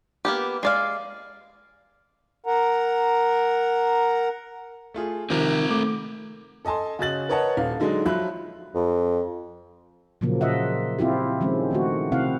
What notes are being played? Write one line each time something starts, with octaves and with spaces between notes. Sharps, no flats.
A#3 B3 G4
G#3 D5 F5
A#4 F#5 A#5
A3 F4 G#4
C3 D#3 F3 C4 A#4
A3 D6
A4 D#5 G#5 A5 C6
C#3 C#4 F#4 D#5 A6 F#7
A#4 B4 C#5 D#5 F#5 A5
D#1 F5
D3 F#3 G#3 D4 D#4
F3 F#3 E5 B5 F#6
F2
A#2 C#3 F3 F#3 A#3
A#2 F4 D#5 E5 F#5
C4 E4 F4 G4
D#3 F3 G#3 C4 C#4
D#3 A3 F#4
C3 C4 E4 F5 F#5